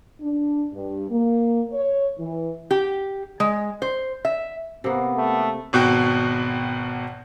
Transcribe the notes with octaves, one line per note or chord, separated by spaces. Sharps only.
D4
G2
A#3
C#5
E3
G4
G#3
C5
E5
C3 A#3 B3
A3
G#1 B2 F#4 G5